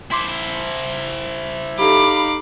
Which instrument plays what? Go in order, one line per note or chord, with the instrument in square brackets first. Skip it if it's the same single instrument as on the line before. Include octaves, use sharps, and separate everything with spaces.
[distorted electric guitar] E4 C5 [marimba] C6 D6
[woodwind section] D#4 F5 B5 [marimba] G4 A4 [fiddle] D6